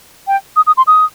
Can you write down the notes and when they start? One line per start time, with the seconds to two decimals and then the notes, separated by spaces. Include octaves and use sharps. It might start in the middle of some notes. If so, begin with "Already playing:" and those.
0.27 G5
0.56 D#6
0.67 D#6
0.77 C6
0.87 D#6